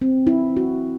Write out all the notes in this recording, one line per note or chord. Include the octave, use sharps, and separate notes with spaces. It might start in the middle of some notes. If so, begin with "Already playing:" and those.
C4
E4
F#4